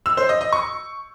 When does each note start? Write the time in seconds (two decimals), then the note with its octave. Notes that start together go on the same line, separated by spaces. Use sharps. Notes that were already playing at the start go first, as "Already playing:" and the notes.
0.06 E6
0.17 C5
0.29 D#5
0.41 D#5
0.52 C#6